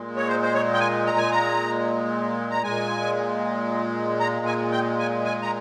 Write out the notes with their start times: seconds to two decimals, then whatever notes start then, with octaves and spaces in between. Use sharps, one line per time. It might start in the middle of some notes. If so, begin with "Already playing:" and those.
Already playing: A#2 G#3
0.16 C#5
0.28 C5
0.42 C5
0.54 C#5
0.74 G5
0.80 G#5
1.07 A#5
1.18 G#5
1.32 A#5
2.51 A#5
2.62 A#2 G#3 G#5
4.20 A#5
4.46 G#5
4.72 G5
4.99 G#5
5.25 G#5
5.42 A#5